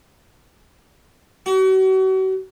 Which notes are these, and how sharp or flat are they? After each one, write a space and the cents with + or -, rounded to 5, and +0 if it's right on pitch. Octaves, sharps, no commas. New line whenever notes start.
F#4 +40